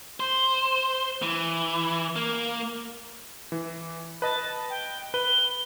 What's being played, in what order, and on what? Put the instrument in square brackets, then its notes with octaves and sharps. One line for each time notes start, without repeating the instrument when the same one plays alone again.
[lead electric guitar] C5
E3
A#3
[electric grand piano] E3
[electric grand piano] B4 D#5 [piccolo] A5
[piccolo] G5
[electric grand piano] B4 [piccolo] G7